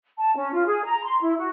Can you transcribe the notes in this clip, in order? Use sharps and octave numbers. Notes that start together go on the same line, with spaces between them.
A5
C#4
F4
G#4
A#5
C6
E4
F#4